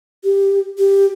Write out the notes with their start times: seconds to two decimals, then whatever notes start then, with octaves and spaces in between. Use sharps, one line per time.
0.24 G4
0.78 G4